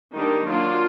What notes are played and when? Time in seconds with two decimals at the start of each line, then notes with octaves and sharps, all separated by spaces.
0.14 D#3 G3 A#3 D4 D#4
0.47 F#3 A#3 D4 F4